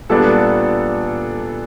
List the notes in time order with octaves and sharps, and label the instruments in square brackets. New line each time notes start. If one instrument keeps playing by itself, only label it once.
[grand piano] A#2 G3 B3 D4 [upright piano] A4